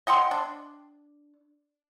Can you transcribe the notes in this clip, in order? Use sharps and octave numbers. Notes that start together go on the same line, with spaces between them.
D#5 F#5 G5 C6
D4